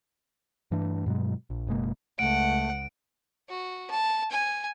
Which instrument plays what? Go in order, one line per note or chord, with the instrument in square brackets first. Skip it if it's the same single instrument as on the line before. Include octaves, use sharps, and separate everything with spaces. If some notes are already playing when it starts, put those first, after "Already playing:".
[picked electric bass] G2 E3 A3 D4
G2 B2 F#3 G#3
A#1
F#1 B2 G#3 A#3
[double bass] C#2 [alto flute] A3 [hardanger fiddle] F#5 [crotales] D7
[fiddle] F#4
A5
G#5